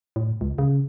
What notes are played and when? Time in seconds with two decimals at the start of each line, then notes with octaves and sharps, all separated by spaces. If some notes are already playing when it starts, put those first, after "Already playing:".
0.16 A2
0.41 C#2
0.58 C#3